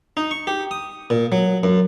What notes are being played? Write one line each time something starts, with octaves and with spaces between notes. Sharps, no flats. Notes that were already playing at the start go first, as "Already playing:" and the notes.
D#4
C#6
G4
D#6
A#2
F#3
F#2